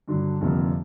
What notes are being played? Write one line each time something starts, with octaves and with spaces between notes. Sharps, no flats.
G2 D3 F#3
F1 F2 D3 G3 A#3